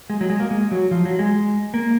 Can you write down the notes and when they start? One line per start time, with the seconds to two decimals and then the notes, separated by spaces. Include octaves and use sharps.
0.10 G#3
0.21 F#3
0.30 G#3
0.40 A#3
0.51 G#3
0.71 F#3
0.91 F3
1.05 F#3
1.19 G#3
1.74 A#3